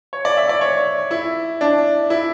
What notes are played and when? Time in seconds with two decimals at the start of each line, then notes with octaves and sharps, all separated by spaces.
0.13 C#5
0.25 D5
0.37 E5
0.49 D5
0.61 C#5
1.11 E4
1.61 D4
2.10 E4